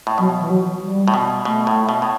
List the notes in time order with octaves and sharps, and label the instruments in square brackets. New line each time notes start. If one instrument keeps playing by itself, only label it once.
[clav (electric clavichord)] A2
[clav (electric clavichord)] B2 [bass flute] F#3
[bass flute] E3
F#3
G3
[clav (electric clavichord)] A2
B2
[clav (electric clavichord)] B2 [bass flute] A3
[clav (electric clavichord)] A2
B2
A2